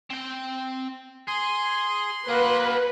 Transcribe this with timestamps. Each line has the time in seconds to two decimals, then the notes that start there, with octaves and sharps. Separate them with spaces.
0.10 C4 G5
1.28 G#4 C6
2.29 A#3 F#4 G#4 B4